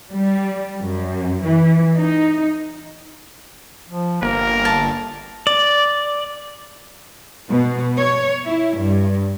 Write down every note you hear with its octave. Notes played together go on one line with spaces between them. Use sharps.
G3
F#2
E3
D#4
F3
G1 A#3 A#4
A5
D5
B2
C#5
E4
G2